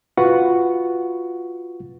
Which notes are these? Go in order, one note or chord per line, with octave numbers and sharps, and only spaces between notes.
F4 F#4 B4 F#5 C#6